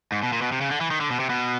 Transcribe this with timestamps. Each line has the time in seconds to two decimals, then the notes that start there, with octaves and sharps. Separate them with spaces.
0.12 G#2
0.23 B2
0.33 A#2
0.42 B2
0.52 C3
0.61 C#3
0.71 D3
0.81 E3
0.91 D#3
1.00 D3
1.10 B2
1.20 C3
1.30 B2